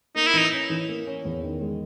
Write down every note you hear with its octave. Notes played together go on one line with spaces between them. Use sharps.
A#3 D#4
E4
E3 D#4
C#4
E3
A#3
C#4
E2
D#3
G#3